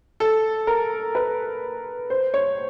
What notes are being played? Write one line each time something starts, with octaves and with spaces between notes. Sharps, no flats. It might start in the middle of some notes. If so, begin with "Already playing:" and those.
A4
A#4
B4
C5
C#5